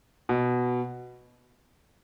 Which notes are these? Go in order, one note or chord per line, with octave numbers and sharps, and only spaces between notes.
B2